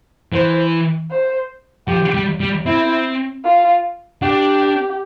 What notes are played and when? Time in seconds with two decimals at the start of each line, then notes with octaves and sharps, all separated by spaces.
0.32 E3 C5
1.11 C5
1.88 F3 G4
2.14 G3
2.40 G3
2.66 C4 E4
3.44 F4
4.22 D4 G4